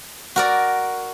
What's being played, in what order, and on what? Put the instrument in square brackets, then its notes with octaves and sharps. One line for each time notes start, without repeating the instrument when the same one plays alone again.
[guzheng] F#4 A#4 D5